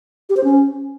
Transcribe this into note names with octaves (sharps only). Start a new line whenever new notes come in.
G4
C5
C#4